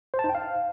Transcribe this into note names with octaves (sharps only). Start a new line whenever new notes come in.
C5
A5
D#4
G5
F5